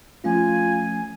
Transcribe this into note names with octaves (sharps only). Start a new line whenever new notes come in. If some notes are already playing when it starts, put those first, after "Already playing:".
F3 A3 C#4 F4 G#5